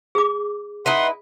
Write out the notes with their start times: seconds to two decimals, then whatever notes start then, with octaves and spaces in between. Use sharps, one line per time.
0.15 G#4 D6
0.86 D#4 E4 B4 F#5 C6